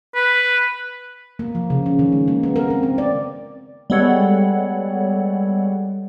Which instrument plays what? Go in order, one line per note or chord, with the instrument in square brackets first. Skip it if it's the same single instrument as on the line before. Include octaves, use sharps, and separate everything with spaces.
[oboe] B4
[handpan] A#3
F3
C#3
C#4
D#3
G#3
A#3
B3
A#4
C4
C4
D5
[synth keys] G3 G#3 B3 A4 C#5 F#5